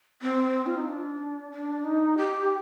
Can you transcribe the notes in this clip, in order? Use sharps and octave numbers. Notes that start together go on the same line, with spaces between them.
C4
F4
D#4
D4
D4
D#4
G4